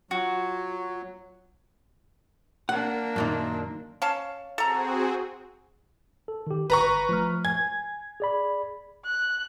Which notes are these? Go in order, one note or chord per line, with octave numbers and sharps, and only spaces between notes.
F#3 F4 F#4
A#3 D4 F#5
F#2 A#2 D#3
C#4 F5 A5
C4 F#4 G#4 A4 A#5
A4
D#3 G4
G1 B4 A#5 C#6
F3 A3 F6
G#5 G#6
G#4 D5 B5
F#6